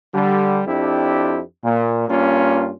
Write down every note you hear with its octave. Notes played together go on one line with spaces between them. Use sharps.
D3 G3
F2 C4 D4 E4 G4
A#2
G2 A#3 C#4 F4